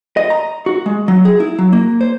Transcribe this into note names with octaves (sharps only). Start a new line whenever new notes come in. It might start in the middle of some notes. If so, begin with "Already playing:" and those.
D#5
A#5
F#4
G#3
F#3
G#4
E4
F#3
A#3
C5